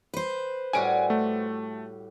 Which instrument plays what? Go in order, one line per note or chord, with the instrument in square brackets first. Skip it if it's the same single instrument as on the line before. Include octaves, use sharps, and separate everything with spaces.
[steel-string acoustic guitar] B4 C5
[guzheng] A2 G3 F#4 [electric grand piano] G#5 D7
[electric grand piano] A3